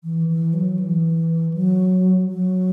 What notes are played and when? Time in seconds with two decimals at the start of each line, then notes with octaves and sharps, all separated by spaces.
0.04 E3
0.28 E3
0.53 F#3
0.79 E3
1.53 F#3
2.29 F#3